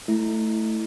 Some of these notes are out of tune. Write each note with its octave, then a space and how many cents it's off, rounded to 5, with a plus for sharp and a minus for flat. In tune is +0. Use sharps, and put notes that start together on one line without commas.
A3 +0 E4 +0